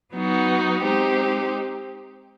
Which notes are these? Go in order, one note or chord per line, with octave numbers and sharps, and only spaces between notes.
F#3 B3 D#4 F#4
G#3 C4 D#4 G4